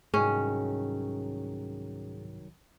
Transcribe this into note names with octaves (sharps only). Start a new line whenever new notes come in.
C2 G#2 D#3 F#3 C#4 G#4